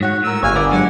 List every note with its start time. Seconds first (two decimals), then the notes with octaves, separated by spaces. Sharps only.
0.01 G#2 F#4 C#5 F#5
0.23 A2 A#4 E6
0.43 G1 C#5 F5 G#5
0.55 B3 A#4 D5
0.71 F#3 G#3 D4 F#5